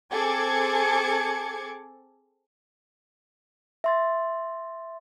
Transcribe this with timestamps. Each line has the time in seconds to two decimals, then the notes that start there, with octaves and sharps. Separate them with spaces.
0.12 C4 G#4 A4 D6 G#6 C#7
3.84 E5 C6 A6